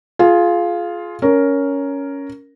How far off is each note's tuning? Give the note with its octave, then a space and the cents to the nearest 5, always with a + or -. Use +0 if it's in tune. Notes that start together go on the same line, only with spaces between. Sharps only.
F4 +0 G#4 +25
C#4 +10 A#4 +0